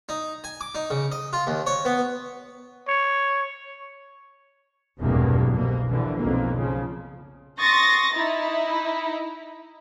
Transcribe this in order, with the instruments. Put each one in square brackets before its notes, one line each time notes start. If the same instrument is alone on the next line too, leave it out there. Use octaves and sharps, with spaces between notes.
[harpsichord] D#4
G#5
D6
D#4
C#3
D#5
F4
D#2
C#5
B3
[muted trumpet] C#5
[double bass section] F1 B1 E2 G2 A#3
C2 B2 A#3
A#1 B2 D3 E3
B1 F2 A#3
C#3 F3
[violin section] C6 C#6 D#6 A6 A#6
D#4 E4